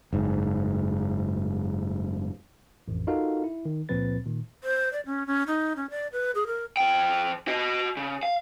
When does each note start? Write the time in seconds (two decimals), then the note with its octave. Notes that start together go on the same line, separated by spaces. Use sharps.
0.13 F#1 G#2
2.88 A1 F2
3.07 D#4 F4 F#4 A4 A#4 F5
3.44 E4
3.65 D#3
3.89 C#2 A#2 F3 C4 B4 A6
4.26 A#2 D#3
4.64 C5
4.93 D5
5.06 C#4
5.27 C#4
5.47 D#4
5.76 C#4
5.90 D5
6.13 B4
6.35 G#4
6.47 A#4
6.77 F3 G5
7.48 F#4 D#5
7.97 C#3
8.23 F5